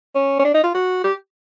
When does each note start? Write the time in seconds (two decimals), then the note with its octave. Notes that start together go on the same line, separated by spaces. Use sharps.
0.15 C#4
0.39 C#4
0.45 D4
0.54 D#4
0.64 F4
0.74 F#4
1.04 G4